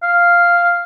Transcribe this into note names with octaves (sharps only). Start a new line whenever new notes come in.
F5